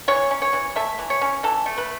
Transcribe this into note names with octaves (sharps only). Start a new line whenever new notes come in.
E3 C#5
C#4
C#5
E3
A3 E5
E3
C#5
C#4
E3 A4
A3
B4